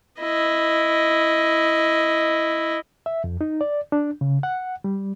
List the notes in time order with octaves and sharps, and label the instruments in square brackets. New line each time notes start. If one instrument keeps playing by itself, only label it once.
[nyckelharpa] E4 D#5
[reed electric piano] E5
F2
D#4
D5
D4
C#3
F#5
G3